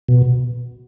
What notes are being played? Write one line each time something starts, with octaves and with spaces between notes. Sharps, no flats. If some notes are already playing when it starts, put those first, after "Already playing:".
B2